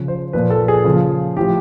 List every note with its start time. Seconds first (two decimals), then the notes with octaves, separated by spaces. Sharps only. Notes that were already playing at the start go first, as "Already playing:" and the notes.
Already playing: C#3 F3
0.08 C5
0.33 A#2 F3 B4
0.50 A4
0.68 G#4
0.84 C#3 F3
1.37 A2 F3 G4